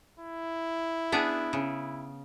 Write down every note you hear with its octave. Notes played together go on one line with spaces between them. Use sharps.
E4
B3 D4 G#4
C#3